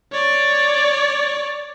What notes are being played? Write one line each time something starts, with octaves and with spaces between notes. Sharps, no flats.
C#5 D5